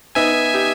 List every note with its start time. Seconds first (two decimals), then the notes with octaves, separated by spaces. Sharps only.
0.15 B3 D#4 E5 G#5
0.54 D#4 G4